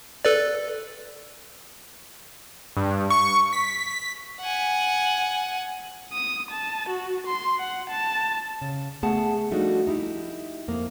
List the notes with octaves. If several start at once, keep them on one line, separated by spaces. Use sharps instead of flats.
A4 B4 D5
G2
C#6
B6
F#5 G#5
D#6
A5
F#4
C6
F#5
A5
C#3
A3 B3 G#4 F#5 A5
F3 G3 A3 D4 D#4 F#4
D#4 E4 G4
F2 A#3